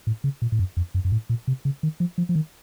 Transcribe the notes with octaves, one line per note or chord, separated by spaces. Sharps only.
A2
C#3
A#2
A2
F#2
F2
F#2
F#2
A2
A#2
C3
C#3
D#3
F3
F3
F3
D#3